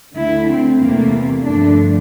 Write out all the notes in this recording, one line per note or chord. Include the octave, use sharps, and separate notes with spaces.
D2 D3 A3 E4
C4
E2 C3 E3 A3 A#3
G2 D3 F3 A3 D4